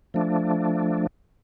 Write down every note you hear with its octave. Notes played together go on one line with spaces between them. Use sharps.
F3 A3 D4